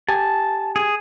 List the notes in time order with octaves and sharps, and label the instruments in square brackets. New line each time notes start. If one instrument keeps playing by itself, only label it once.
[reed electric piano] G4 G#5 [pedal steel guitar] A5
[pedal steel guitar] G#4